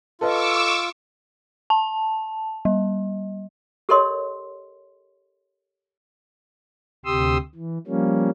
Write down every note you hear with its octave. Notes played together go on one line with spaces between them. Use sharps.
F4 A4 B4 D#5 C#6 D6 E6
A5
G3
G4 A4 A#4 C#5 D#5 C6
D2 C3 G4 C6 D#6 E6
E3
F3 G3 A#3 C#4